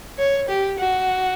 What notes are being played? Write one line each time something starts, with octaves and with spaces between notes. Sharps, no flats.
C#5
G4
F#4